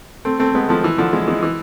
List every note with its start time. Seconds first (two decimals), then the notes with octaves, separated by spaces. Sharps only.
0.25 A3 C4
0.39 A3 C4
0.55 G#3 B3
0.69 F3 A3
0.84 E3
0.98 D3 F3
1.13 E3 G#3
1.27 E3 G#3
1.43 E3